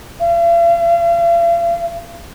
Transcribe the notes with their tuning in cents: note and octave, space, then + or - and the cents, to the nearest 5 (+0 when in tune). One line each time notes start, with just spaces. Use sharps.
F5 -45